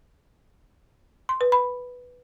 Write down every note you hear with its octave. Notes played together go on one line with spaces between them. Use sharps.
C6
B4
B5